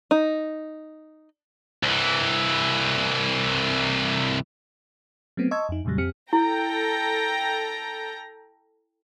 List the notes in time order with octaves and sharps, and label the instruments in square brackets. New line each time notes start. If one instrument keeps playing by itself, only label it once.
[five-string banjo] D#4
[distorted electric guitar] C2 E3
[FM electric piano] F#3 A3 B3 C4
D#5 A5 C6 C#6 E6 G#6
F2 D#4
F2 A#2 C#3 F#3 G3
F2 C4 G4 F6 C#7
[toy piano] E4 [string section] A4 G5 A#5